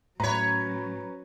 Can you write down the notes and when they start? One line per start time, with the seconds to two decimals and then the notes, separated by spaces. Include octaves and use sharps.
0.20 A2 F#3 C#4 B4 C#5 A#5 B5